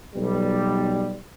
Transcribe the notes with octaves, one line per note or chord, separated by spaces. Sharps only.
B1 G3